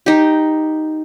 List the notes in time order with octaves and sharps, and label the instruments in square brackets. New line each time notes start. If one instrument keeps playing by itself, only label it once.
[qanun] D#4 G4